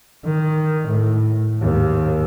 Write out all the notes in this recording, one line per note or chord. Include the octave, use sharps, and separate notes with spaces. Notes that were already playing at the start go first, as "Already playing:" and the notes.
D#3
A2
D#2 G#2